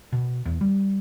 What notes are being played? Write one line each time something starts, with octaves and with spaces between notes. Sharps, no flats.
B2
E2
G3